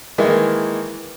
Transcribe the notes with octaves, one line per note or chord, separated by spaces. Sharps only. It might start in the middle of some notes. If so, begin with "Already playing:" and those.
D#3 E3 G#3 A#3